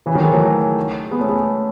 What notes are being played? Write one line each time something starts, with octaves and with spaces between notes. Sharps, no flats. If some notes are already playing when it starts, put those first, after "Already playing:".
C#3 E3
D#3 F#3
E3 G#3
F#3 A3
G#3 B3
A3 C#4
G#3 B3